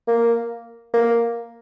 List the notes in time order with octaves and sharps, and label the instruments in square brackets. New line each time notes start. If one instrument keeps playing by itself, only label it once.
[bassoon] A#3
A#3